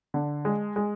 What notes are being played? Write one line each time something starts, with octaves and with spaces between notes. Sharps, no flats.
D3
G#3
G#3